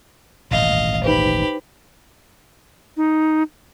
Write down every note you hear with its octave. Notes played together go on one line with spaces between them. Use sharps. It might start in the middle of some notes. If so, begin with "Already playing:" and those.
D#1 A1 D#2 G#2 D#5 F5
D#4 G4 B4 C5 B5
D#4